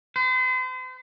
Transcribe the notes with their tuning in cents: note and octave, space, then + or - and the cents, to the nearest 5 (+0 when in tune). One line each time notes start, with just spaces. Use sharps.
C5 -40